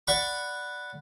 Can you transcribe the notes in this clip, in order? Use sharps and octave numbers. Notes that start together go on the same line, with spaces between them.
D5 F#5 B5 C#6